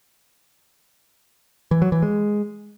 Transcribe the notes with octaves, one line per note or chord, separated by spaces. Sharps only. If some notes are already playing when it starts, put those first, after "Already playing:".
E3
F#3
E3
G#3